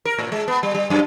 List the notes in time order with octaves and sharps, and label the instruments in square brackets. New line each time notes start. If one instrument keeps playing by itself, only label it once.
[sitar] A#4
A2
G#3
B3
G3
G3
F#2